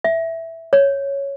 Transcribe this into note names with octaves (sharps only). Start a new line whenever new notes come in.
E5
C#5